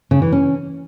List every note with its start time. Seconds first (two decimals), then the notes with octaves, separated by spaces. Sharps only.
0.11 C#3
0.22 E3
0.32 C#4